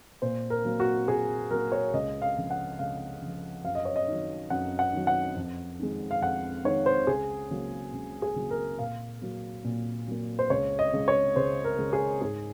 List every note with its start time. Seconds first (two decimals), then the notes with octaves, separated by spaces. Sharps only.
0.22 A#2 C5
0.50 A#4
0.65 F#3 A#3
0.80 F#4
1.08 A#2 G#4
1.50 F#3 A#3 A#4
1.72 C#5
1.93 C#2 D#5
2.22 F5
2.37 C#3 F3
2.50 F#5
2.79 C#2 F5
3.22 C#3 F3
3.65 F#2 F5
3.75 D#5
3.85 C#5
3.96 D#5
4.08 D#3 F#3
4.50 F#2 F#5
4.79 F#5
4.93 D#3 F#3
5.07 F#5
5.36 F2
5.79 D#3 G#3
6.11 F5
6.22 F2 F#5
6.65 D#3 G#3 C#5
6.86 C5
7.07 C#2 G#4
7.51 C#3 F#3 A#3
7.93 C#2
8.22 G#4
8.36 C#3 F#3 A#3
8.51 A#4
8.79 A#2 F5
9.22 F#3 A#3
9.64 A#2
10.08 F#3 A#3
10.39 C5
10.50 C#2 C#5
10.79 D#5
10.93 C#3 G#3
11.08 C#5
11.36 C#2 C5
11.64 A#4
11.79 C#3 G#3
11.93 G#4
12.21 G#2 G#4